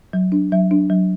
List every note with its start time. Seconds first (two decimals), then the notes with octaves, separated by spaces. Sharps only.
0.13 F#3
0.32 D4
0.52 F#3 E5
0.71 D4
0.90 F#3